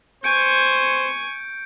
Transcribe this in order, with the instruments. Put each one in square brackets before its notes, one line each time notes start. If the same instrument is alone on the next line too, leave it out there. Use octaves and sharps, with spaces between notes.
[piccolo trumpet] C5 [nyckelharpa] G#5 C#6 [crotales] G6 C#7 D7